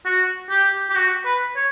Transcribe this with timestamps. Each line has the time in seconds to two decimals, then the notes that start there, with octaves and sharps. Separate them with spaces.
0.05 F#4
0.50 G4
0.90 G4
0.95 F#4
1.25 B4
1.56 C#5